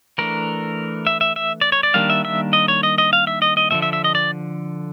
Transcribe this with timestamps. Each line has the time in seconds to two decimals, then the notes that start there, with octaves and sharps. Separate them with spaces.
0.18 E3 A3 D4 A#4
1.07 E5
1.21 E5
1.36 E5
1.61 D5
1.72 C#5
1.83 D5
1.94 D#3 G3 A#3 D4 F5
2.10 E5
2.25 E5
2.53 D#5
2.68 C#5
2.83 D#5
2.98 D#5
3.13 F5
3.27 E5
3.42 D#5
3.57 D#5
3.71 D3 F3 A3 E5
3.82 E5
3.93 E5
4.04 D#5
4.15 D5